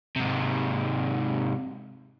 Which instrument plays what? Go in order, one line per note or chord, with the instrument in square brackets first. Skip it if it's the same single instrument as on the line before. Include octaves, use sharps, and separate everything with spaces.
[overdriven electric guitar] G#2 C3